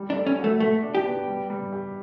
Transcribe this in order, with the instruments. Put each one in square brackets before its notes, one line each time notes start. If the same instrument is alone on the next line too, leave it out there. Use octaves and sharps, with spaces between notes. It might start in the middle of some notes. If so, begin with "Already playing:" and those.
Already playing: [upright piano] G3
[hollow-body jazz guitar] D4
[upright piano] A4
[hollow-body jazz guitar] C#4
[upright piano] F#4
[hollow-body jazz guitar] A3
[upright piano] B2 [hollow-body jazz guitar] A3
[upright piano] D4
[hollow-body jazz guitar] G4
[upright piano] B3
G3
G3
G4